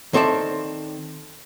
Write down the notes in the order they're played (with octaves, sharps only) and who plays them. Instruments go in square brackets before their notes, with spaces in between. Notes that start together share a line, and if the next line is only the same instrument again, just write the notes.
[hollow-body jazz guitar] D#3 C4 A4 D5 E5